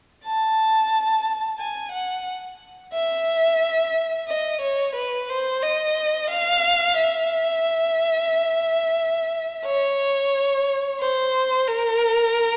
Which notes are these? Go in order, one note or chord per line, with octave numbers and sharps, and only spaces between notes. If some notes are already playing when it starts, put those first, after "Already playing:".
A5
G#5
F#5
E5
D#5
C#5
B4
C5
D#5
F5
E5
C#5
C5
A#4